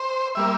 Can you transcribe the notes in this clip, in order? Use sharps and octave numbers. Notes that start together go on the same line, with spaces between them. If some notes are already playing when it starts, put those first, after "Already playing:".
Already playing: C5
G3 A#3 E5